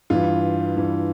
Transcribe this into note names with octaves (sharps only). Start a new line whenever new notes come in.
G2 E3 F4
G2 E3